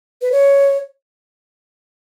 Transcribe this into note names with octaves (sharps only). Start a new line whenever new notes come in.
B4
C#5